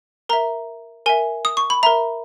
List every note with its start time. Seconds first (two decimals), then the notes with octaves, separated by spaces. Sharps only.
0.29 A#4 E5 A#5
1.06 A#4 E5 G#5
1.45 D#6
1.57 C#6
1.70 B5
1.83 A#4 E5 A#5